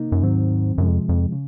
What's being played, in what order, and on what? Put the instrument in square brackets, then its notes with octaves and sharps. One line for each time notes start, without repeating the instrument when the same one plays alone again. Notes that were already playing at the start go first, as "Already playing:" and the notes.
Already playing: [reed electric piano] C3 A#3 D#4
[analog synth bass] F#2
[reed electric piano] D#2 D#3 F#3 C4 [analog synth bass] G#2
[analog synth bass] F#2 [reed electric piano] C3 F3 G#3
[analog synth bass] F2
F2
[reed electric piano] C#3